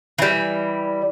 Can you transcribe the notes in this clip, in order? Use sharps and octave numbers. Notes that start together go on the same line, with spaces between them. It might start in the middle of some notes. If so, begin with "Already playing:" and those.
E3 G3